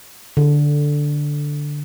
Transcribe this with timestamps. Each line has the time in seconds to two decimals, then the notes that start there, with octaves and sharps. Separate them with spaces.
0.37 D3